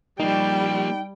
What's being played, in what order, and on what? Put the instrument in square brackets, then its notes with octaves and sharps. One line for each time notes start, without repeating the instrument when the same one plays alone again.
[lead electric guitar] F3 A#3 [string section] G3 [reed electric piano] D#4 [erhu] G5